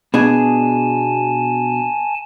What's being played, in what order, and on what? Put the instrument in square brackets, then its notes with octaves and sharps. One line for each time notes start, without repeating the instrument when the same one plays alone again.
[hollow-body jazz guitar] B2 D4 G#4 [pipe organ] G#5 A5